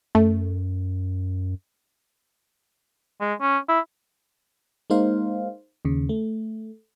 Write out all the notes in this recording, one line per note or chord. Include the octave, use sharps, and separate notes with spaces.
F#2 A3
G#3
C#4
E4
G#3 A#3 D#4 C5 F5
D#2 C#3
A3